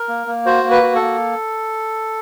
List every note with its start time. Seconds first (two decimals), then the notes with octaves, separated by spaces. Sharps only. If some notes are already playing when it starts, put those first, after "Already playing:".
Already playing: A#4
0.08 A#3
0.27 A#3
0.46 F#4 C5
0.64 A#3
0.71 B4
0.83 F#4
0.95 A4
1.01 A#3